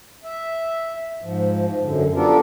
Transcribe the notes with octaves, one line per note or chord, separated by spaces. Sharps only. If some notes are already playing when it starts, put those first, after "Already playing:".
E5
G#2 F3
F#2 D3
B3 D4 F4 G4 A4 A#4